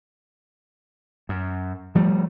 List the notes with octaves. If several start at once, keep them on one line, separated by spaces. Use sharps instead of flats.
F#2
F3 G3 A3